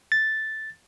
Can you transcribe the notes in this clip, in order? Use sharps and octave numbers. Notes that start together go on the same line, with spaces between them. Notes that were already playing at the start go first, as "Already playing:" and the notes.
A6